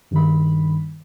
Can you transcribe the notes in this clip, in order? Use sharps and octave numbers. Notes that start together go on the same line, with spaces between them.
G2 D#3 B5